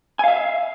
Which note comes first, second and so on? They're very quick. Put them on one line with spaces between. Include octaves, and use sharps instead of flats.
G#5 F5 E5